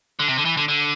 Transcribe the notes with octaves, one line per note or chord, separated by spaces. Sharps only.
D3
C3
D3
E3
D3
D3